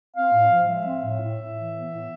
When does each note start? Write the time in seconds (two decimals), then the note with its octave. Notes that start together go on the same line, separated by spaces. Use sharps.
0.16 C4 F5
0.33 A2
0.51 F3
0.69 G#3 E5
0.86 C4
1.04 A2
1.21 A2
1.39 A2
1.56 E3
1.74 B3
1.91 A2